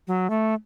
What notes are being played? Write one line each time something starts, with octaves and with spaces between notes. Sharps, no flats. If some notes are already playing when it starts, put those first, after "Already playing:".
F#3
A3